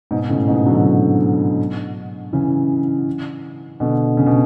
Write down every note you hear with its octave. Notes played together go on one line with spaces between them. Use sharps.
G#2 B2
A2 C#3
G#2 B2
D3 F#3
C#3 E3
B2 D3
C#3
B2